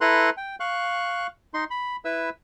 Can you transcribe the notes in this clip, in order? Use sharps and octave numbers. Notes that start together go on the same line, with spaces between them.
E4 A4 B4 A#5 C6 F#6
G5
F5 C#6 F#6
D#4 C6
B5
E4 B4 E5 E6